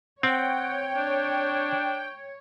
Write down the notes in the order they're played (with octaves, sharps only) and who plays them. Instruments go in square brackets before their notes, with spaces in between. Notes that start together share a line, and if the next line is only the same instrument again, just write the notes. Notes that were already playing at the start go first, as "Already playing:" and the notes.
[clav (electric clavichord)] C4 [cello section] C#5 [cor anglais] F#5 [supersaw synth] G5
[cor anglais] D4